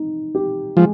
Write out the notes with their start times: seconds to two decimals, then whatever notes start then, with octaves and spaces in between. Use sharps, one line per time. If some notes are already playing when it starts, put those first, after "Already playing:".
Already playing: D#4
0.35 G4
0.77 F3 G#3